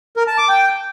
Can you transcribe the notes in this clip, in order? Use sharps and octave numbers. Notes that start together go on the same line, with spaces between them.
A#4
A5
D6
G5